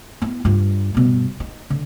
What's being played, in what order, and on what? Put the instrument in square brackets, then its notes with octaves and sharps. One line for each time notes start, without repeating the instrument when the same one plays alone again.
[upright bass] B3 E4
G2 F4
G2 B2
D#4
D3